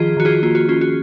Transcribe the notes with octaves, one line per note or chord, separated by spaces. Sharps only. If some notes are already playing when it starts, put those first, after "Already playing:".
Already playing: D#3 F3 F4 G#4
D#3 F#4
F4 G#4
A#3 F4
F#4
C#4 F4
F#4